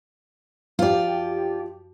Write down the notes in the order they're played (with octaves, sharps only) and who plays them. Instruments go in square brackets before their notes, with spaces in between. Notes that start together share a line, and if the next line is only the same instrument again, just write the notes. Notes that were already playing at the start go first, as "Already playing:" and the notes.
[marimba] F#2 [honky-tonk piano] F3 G4 [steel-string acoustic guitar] F4 D5